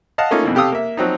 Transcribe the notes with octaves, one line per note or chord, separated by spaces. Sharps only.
D#5 F5 F#5 A5
A3 A#3 C#4 D#4 F4
F2 B2 E3
C3 G4 A4 F5 D#6 E6
A#3 E5
F3 F#3 C4 D#4